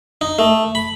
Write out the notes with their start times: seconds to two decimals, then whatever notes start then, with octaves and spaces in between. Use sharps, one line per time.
0.21 D#4
0.39 A3
0.75 B5